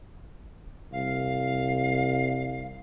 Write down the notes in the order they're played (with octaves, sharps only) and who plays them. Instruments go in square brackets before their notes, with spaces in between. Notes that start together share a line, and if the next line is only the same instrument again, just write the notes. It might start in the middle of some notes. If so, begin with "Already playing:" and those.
[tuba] C2 [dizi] F5